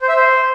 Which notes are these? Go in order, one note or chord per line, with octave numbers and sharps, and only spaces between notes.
C5
E5
C5